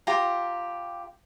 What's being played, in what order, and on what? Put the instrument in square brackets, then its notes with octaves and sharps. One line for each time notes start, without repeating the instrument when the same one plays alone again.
[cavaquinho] F4 G4 A#5